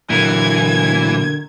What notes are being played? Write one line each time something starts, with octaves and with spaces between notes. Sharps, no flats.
A#2 D3 E3 F#3 A#4 G#6